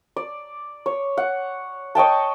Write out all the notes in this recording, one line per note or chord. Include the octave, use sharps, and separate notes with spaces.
D5
C#5
F#5
C#5 D#5 G5 A5